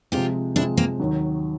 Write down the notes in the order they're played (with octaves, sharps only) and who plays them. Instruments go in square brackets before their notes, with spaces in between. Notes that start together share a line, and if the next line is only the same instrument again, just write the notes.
[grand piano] C3 F3 G#3 C4 [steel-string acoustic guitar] F4 G4
[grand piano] C3 F3 G#3 C4 [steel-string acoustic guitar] D4 E4
[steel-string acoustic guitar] A#3 C4
[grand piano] D#2 D#3 F#3